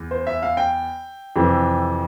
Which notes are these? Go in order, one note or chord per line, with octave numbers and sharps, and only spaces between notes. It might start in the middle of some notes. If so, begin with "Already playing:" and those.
Already playing: E2
C5
E5
F5
G5
F2 C3 E3